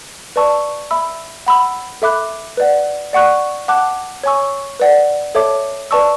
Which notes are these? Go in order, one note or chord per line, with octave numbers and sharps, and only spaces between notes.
B4 D5 A5 C#6 E6
E5 B5 E6
F#5 B5 E6
A4 E5 B5 D6 F#6
B4 D5 F#5
D5 F#5 C#6 F#6
F#5 A5 D6 F#6
C#5 G#5 C#6 E6
B4 D5 F#5
A4 C#5 E5 A5 D6
B4 D5 A5 C#6 E6